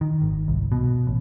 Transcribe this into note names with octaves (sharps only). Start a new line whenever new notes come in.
D#3
G#1
C2
B2
A1